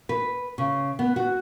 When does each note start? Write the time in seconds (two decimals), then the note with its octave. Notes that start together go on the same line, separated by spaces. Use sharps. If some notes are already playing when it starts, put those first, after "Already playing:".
0.09 B4
0.58 C#3
0.99 B3
1.16 F#4